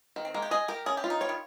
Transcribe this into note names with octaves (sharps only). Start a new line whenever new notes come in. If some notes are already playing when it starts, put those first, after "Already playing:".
D#3
C4
G#3 A#3
G4
G#4 D#5
G4 A#4
C#4 G#4
G4
F4
D#4
G3 C#5
D#3